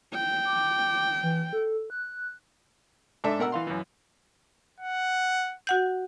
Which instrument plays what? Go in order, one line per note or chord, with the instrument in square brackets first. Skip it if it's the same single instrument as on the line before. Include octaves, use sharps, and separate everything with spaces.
[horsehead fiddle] G5
[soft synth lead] D6
E3
A4
F#6
[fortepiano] G#2 D4 A4 E5
B2 A#4 F#5 E6
E3 F5 C6
F#2 E3
[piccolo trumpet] F#5
[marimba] F#4 F#5 G6